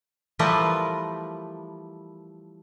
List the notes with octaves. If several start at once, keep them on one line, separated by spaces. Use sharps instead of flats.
E3 F3 G3 A3 A#4 B4